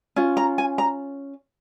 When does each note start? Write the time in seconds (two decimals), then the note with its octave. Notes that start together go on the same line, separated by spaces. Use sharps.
0.16 C#4 F4
0.37 A#5
0.58 G#5
0.78 A#5